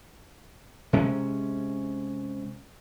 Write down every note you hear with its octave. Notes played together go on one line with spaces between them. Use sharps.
C3 G#3 C#4